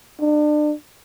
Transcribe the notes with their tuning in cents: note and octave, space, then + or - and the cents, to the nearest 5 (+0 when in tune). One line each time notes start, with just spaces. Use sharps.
D4 +35